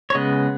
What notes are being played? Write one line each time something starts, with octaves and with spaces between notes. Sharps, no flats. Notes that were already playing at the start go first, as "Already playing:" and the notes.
C#5
C#3 G#3 B3 D#5